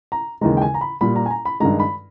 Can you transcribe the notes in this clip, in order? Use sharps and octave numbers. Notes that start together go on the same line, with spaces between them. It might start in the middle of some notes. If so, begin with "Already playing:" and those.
A#5
D#2 C#3 E3 G#3 A#5
G5
G#5
A#5
B5
A#2 G3 B5
A#5
G#5
A#5
B5
G2 D#3 G#3 A#5
B5